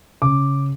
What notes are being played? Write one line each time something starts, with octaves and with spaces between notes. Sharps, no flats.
C#3 D6